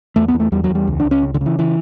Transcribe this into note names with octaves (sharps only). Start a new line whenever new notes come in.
E2 A3
B3
E2
A3
E2 G3
F#3
E2
G3
C#2
D4
C#2
C#4
C#3
D3
C#3
E3
E3